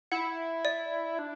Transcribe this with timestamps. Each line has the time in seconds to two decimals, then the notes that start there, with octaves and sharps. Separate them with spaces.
0.12 E4 F#5
0.65 D5
1.19 D4